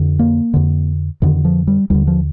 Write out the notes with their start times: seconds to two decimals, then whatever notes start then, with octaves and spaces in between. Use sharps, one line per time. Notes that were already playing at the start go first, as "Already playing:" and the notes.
Already playing: F2 D3
0.19 A#3
0.54 F2 D3
1.22 F2 D3 D#3
1.45 F3
1.67 G3
1.90 D#2 D3 G3
2.07 F3